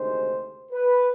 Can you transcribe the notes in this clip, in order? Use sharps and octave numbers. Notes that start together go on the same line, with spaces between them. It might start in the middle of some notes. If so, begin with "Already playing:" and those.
Already playing: D2 C3 D#3 G#3 C5
B4